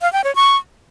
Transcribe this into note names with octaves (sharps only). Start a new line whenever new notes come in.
F5
G5
C#5
C#6